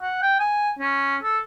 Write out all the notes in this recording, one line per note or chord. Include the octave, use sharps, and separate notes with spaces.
F#5
G5
G#5
C#4
A4